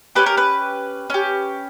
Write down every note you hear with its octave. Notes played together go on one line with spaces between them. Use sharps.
C#4 G4 B4
A#4
B4
C#4 G4